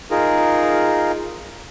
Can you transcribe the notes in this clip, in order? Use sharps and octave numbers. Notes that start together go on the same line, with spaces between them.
D#4 F4 G#4 A#4